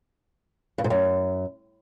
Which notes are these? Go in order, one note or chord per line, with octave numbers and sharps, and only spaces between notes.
G2
G#2
F#2